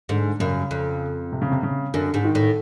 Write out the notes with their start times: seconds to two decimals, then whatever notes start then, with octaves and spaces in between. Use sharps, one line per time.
0.09 G#2 D3
0.40 F#2 C#3
0.71 F2
1.32 C3
1.42 C#3
1.52 C3
1.63 C#3
1.94 F#2 D3
2.14 G#2
2.24 D#3
2.35 A2